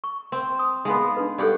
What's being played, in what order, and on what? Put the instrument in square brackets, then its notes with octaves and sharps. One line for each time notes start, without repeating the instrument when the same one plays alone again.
[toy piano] C#6
[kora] C4
[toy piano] D#6
[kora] G#3 B3 [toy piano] D#4 E4 F5
[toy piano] D4 D#4 B4
[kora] G2 G4 F#5 [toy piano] A4 D5